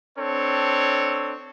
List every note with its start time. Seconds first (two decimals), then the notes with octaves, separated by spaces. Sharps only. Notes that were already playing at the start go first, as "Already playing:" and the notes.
0.19 C4 D4 A4 C#5